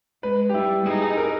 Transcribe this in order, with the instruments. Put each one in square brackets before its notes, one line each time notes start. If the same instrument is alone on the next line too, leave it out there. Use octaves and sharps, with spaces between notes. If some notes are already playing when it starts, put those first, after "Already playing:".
[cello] G#3 [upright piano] B4
[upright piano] G4
[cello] G3 [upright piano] E4
[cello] D#4 [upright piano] G#4
[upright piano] G#4
A#4